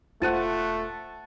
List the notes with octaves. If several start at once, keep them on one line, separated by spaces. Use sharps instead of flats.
E1 A3 F4 C5 F#5 A5 D#7